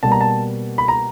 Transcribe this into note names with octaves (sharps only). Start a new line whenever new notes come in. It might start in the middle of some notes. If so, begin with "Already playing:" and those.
B2 G3 A#3 A5
A#5
A5
B5
A#5